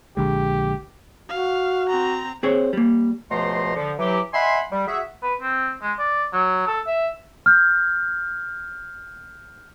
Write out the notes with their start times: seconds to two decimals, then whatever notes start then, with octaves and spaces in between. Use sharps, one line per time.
0.17 A#1 D3 G#3 G4
1.29 F#4 F5
1.89 C4 A#5
2.43 C4 G#4 C5 C#5
2.73 G3 A#3
3.31 C#2 B2 F3 A3 A#5 C6
3.76 D3 F3
3.99 E3 F#3 G4
4.34 D#5 E5 F#5 G#5 B5 C6
4.72 G3
4.88 F#4 G#4 E5
5.23 B4
5.41 C4
5.82 G#3
5.99 D5
6.33 F#3
6.68 A4
6.87 E5
7.46 F6 G6